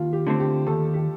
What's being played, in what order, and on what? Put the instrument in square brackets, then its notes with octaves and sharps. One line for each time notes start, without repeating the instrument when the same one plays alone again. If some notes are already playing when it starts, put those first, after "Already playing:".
Already playing: [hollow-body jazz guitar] D#2 [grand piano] F4
[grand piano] G4
[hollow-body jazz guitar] D3 A3 C4
[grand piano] G4
[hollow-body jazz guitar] D#2 [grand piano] A4
[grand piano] G4